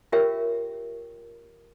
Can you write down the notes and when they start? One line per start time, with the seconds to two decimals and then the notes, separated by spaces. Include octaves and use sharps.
0.12 F4 G4 A#4 C#5 E5 G5